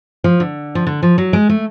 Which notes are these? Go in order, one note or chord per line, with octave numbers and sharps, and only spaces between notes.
F3
D3
F3
D3
F3
F#3
G#3
A3